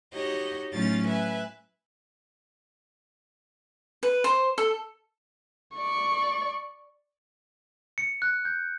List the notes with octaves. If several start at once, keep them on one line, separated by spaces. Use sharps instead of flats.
D#4 F#4 G4 C#5 D#5
A2 F#3 C#4 D#4 F4 A6
B4 E5 G#5
B4
C5
A4
D5 C#6
C#7
F#6
G6